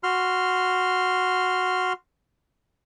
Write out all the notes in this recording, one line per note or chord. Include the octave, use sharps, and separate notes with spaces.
F#4 C6 F6